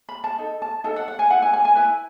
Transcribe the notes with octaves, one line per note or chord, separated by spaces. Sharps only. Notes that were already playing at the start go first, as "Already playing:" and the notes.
B5
A5
D#4 A4
A5
D#4 A4 A5
F#5
F#5
G#5
E4 B4 F#5
G#5
G#5
G#5
E4 B4 G#5